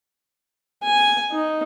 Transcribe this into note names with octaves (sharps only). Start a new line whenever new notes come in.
G#5
D#4